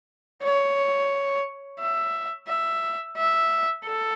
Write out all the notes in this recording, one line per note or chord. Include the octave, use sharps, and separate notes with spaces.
C#5
E5
E5
E5
A4